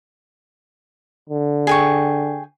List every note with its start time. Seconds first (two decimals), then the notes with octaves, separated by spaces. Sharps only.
1.30 D3
1.67 G#4 G5 C#6